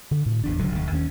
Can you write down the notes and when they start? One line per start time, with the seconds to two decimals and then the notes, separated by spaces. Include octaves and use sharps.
0.11 D3
0.26 A2
0.44 G#1 E2 D4
0.58 D1 C#2 D3 F#3
0.72 F1 D#2
0.92 D#2 D#3 B3 C#4